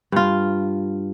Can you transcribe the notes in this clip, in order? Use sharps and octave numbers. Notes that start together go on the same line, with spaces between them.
G2 F4